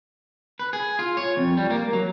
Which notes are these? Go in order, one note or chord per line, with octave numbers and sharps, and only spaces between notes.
B4
G#4
F4
C#5
F2
G3
A#3
F#3